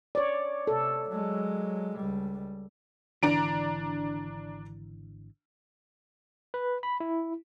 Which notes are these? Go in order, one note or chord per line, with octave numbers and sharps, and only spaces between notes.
C#5 D5
C3 A4
F#3 G#3
C#2 G3
G#1 D3 E3 D4 A#5 D7
B4
B5
E4